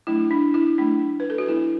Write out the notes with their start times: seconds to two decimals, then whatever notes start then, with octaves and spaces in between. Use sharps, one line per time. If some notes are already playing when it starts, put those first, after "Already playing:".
0.07 F#3 A3 D4 E4
0.31 D4
0.54 E4
0.78 F#3 A3 D4
1.20 B4
1.30 A4
1.38 F#4
1.47 F#3 B3 D4 E4